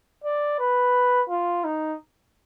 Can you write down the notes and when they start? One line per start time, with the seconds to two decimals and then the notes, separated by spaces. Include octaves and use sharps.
0.24 D5
0.59 B4
1.30 F4
1.64 D#4